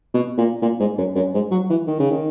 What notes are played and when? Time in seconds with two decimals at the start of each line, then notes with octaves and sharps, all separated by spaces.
0.14 B2
0.38 A#2
0.62 A#2
0.80 G#2
0.98 F#2
1.15 F#2
1.34 G#2
1.51 F#3
1.70 E3
1.87 D#3
1.99 C#3
2.11 D#3